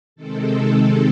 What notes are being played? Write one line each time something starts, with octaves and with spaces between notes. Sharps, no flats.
C3 D#3 G#3 C4 A4